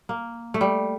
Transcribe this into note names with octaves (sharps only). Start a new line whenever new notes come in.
A#3
A3
G3